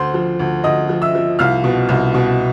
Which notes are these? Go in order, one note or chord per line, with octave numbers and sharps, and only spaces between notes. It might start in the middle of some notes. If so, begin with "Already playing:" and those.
Already playing: D2 C5 C6
F3
D2
D2 D#5 D#6
F3
E5 E6
F3
C2 F5 F6
B2
C2
B2